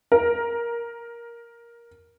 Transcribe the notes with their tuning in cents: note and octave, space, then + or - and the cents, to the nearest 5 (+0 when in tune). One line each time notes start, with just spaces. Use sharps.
A#4 +10